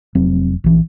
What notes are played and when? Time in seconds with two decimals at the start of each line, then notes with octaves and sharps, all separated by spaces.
0.15 F1 F#3 C4
0.64 A#1 E3